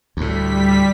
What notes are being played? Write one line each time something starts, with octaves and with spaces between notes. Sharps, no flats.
D2 A2 G3 B6